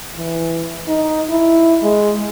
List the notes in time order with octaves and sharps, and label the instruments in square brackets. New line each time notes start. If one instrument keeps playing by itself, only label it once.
[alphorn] E3
D#4
E4
G#3